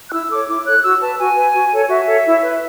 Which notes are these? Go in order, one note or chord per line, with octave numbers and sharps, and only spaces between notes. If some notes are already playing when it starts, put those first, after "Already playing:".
F#6
E4 E6
A4 C#5 D6
E4 D6
A4 C#5 F#6
F#4 E6
B4 A5
F#4 G#5
B4
F#4
A4 C#5
F#4 E5
A4 C#5
E4
B4